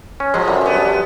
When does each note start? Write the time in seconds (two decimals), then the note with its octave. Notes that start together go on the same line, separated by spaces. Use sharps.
0.20 C#4
0.34 F3 F#3 G#3
0.48 F#2 D3 G3
0.61 G2 B3